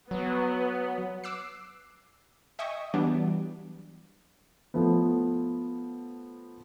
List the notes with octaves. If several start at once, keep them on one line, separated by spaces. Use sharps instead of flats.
F#3 B3
D6 E6 F#6 C7
D#5 E5 G5 G#5 C#6 D#6
E3 F#3 G3 B3 D4 G4
F3 A3 B3